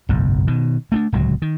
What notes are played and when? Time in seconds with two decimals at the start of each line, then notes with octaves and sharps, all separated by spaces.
0.09 F#1 B1 G#2
0.47 B2 D#3
0.92 A3 C#4 D4
1.12 D1 C#2 D3 F#3
1.42 D#3